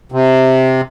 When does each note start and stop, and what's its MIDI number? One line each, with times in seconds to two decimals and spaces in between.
0.12 0.81 48